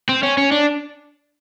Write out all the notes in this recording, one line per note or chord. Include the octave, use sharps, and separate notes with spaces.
C4
C#4
C#4
D4